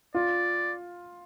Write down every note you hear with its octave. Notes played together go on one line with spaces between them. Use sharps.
F4 D5